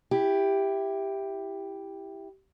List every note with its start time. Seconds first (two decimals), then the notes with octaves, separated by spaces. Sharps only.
0.11 E4 G4